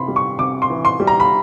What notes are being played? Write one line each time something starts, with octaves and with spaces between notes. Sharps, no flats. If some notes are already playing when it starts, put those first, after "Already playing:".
Already playing: C3 E3 B5 C6
G3
C#6
C3 D6
C6
E3
C6
G3
A#5
B5